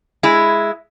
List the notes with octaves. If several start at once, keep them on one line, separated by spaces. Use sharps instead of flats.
G#3 E4